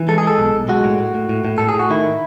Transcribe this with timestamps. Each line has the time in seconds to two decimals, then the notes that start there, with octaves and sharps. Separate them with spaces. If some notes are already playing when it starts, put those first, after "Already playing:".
Already playing: E3
0.08 G#3 A4
0.18 G#4
0.23 G#3 A4
0.38 B1
0.54 B1
0.69 G#3 F#4
0.84 A2
0.99 A2
1.14 A2
1.29 A2
1.45 A2
1.58 A2 A4
1.69 G#4
1.75 A2 F#4
1.90 D#3 E4